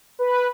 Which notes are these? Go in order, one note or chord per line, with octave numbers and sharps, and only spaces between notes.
B4